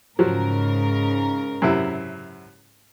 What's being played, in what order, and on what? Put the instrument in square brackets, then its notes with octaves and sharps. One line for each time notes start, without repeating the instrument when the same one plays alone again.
[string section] G#2 C#3 A#4 [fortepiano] F3 F#3
[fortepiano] F#2 C3 E4